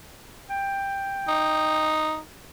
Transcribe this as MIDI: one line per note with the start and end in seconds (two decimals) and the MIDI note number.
0.50 1.96 79
1.28 2.19 63